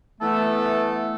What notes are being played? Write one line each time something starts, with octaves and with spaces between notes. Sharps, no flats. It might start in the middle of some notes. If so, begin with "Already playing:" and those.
E3 A3 B3 A4